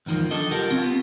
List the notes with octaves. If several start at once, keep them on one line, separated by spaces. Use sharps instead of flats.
E2 G#2 D#3 F3 A#3
F#3 D4 A4 D#5
C2 F4 G4 A4 A#4 F#5
C4 C#4 F4
B3